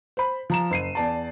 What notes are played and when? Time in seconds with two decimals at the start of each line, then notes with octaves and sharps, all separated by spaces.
0.17 C5 B5
0.50 F3 A#5 E7
0.71 F#1 C7 D#7
0.95 E2 D5 A5